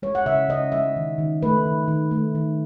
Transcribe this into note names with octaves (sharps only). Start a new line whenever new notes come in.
G#3 C#5
F#5
C#3 E5
C#3 D#5
G#3 E5
D#3
D#3
A3 B4
D#3
D#3
A3
D#3